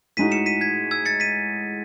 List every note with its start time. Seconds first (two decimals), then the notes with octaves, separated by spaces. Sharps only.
0.17 A2 G#3 D#4 F#4 B6 D#7
0.31 C#7 E7
0.46 B6 D#7
0.61 G#6 B6
0.91 E6 G#6
1.06 A6 C#7
1.20 B6 D#7